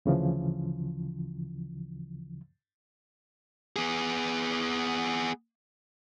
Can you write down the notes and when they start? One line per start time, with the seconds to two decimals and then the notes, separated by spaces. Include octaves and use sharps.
0.06 D2 C#3 E3 F3
3.76 B3 G#4